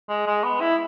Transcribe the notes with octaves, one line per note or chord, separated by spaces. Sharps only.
G#3
G#3
B3
E4